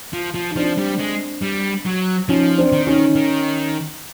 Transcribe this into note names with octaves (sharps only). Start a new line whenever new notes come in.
F3
F3
D#4
F3 C4 D4
G3
G#3
G3
F#3
F3 C#4 D#4
C4 D4
D#3
C#4 D#4
D#3